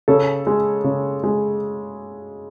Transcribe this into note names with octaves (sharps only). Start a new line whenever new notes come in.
C#3 A4
G#3
C#3
G#3